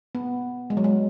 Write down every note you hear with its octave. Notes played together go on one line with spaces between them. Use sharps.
B3
G#3
F#3
G#3